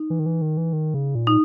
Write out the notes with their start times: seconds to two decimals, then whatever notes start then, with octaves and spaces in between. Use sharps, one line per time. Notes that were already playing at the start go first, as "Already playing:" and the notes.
Already playing: D#4
0.10 E3
0.19 D#3
0.26 E3
0.42 D#3
0.57 E3
0.73 D#3
0.94 C#3
1.15 A#2
1.27 D#4